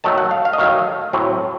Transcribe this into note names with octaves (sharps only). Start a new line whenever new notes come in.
D#3 F#3 A3 A5
F#5
F5
F5
D#5
D#3 F#3 A3 F5
A2 F#3 C4